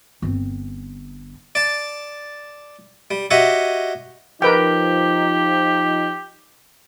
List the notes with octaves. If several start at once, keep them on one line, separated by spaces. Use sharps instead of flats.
G1 C4
D5 A5
G3
F#4 G4 C#5 D#5 E5 F#5
F3 D#4 G4 A#4 B4 G5